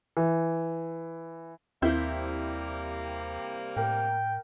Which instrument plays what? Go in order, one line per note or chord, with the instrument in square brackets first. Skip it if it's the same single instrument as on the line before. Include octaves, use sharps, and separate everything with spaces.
[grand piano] E3
[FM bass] D#2 [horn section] C3 G3 A#3 [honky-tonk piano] C4 E4 G6
[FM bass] A2 [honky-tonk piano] A#4 [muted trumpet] G5